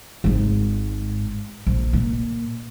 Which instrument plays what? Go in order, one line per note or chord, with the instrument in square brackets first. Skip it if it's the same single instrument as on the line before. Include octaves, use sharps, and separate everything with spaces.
[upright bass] G#1 G#2
A#1
A#2